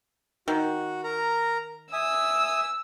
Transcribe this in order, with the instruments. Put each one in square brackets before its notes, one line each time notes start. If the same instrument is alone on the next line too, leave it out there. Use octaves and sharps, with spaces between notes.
[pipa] D#3 [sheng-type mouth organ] F#4
[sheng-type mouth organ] A#4 A#5
[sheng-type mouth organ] E5 G#5 D#6 [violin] E6